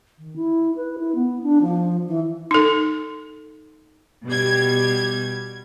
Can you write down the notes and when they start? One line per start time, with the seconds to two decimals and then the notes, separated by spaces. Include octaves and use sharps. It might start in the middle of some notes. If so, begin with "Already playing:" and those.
0.18 D#3
0.35 E4
0.75 B4
0.98 E4
1.15 B3
1.42 D4
1.61 F3
2.07 E3
2.51 D#4 A4
4.26 B2 G3 G#6